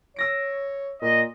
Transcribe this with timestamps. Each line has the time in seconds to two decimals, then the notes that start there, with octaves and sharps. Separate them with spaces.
0.16 C#5 E6 A#6 D7
1.02 A#2 D#5